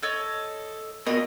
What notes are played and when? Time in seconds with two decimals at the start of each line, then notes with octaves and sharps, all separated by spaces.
0.02 A4 C#5 D#5
1.07 B2 A#3 D#5